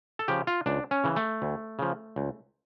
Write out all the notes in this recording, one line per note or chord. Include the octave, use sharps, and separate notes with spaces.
A4
C#3 F3 G4
F4
C#2 D4
C#4
C#3 E3
A3
D2
C#3 F3
C#2